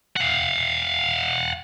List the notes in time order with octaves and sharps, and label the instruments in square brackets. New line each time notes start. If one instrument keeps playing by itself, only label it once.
[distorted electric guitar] F5 F#5